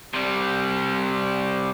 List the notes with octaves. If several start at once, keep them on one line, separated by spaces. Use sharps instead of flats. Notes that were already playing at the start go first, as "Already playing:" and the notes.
C3 G3